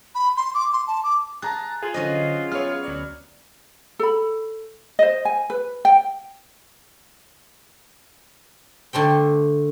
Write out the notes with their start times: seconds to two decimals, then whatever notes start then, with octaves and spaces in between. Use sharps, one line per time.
0.15 B5
0.37 C6
0.54 D6
0.73 C6
0.87 A5
1.03 D6
1.42 G#4 A5 A#5 F#6 A6
1.83 F4 G#4 G#5
1.94 D3 F#3 C#4 C5 D#5
2.52 B3 G#4 C#5 E5 F6
2.84 D2 F#3 D5
3.99 A4 B5
4.99 C5 D#5
5.25 G#5
5.50 B4
5.85 G5
8.93 D3 A3 C5 G5